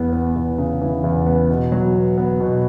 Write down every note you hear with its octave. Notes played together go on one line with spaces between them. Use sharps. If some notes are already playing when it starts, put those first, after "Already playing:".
Already playing: E2 B3
B3
E2
C#3
E3
E2
B3
B2
F#3
B3
B3
B2